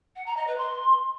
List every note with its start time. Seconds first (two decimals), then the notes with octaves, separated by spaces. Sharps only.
0.16 F#5
0.26 A#5
0.37 D#5
0.47 B4
0.58 C6